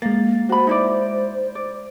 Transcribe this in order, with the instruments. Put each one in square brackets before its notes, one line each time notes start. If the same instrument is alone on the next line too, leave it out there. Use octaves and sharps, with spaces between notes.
[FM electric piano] G#3 A6 [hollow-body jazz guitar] A#3
[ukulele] F#4 B5 [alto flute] C5
[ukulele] D#4 E4 D5
D5